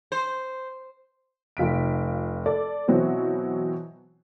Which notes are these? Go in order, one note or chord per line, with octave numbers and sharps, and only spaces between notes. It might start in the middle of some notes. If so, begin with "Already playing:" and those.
C5
F1 F4 B6 D7
A4 D5
B2 E3 F#3 C4 E4 F#4